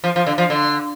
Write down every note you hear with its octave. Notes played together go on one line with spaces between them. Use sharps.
F3
F3
D3
F3
D3